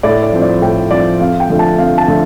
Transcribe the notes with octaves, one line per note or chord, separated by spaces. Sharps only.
A2 D5
D5
F3 C4
D5
A2 G5
F3 C4 D5
F2 F5
G5
D3 F3 A3
A5
F2 F5
A5
D3 F3 A3